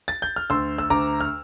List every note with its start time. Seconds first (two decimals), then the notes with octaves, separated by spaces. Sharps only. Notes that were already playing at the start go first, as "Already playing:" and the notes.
0.08 A6
0.22 G6
0.36 F6
0.50 D2 C6 E6
0.78 E6
0.90 D2 A#5 D6
1.21 F6